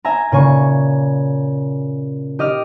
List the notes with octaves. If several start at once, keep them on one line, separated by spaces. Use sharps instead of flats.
E5 G#5 A#5
A#2 C#3 G#5 C#6
G4 D#5 D6 F6